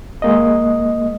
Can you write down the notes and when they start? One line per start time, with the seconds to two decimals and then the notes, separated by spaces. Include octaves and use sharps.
0.22 G#3 A#3 D#5